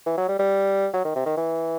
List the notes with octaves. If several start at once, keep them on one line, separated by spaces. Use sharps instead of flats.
E3
F#3
G3
G3
F#3
D#3
C3
D#3
E3